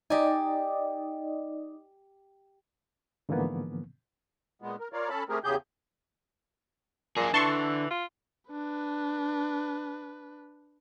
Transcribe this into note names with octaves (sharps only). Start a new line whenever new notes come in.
D#4 G4 D5 D#5 G#5
G#2 D3 E3 F3 A#3 B3
A#2 G#3 B3
A#4
F4 A#4 C#5 D5 F5
C#4 A4 A5 B5
A3 C4 G4 G#4 A#4
E2 C#3 G4 G#4 G6
A#2 A#3 G#4
D3 E3 A5 C6 C#6
F4
D4 B4